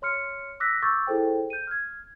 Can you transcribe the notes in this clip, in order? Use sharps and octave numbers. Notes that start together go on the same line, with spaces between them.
C#5 C6 F6 C#7
D6 E6 F#6 A#6 B6
C#6 D6 E6 G6 A6
E4 G#4 A4 C5 G5
G6 D#7
F6 G#6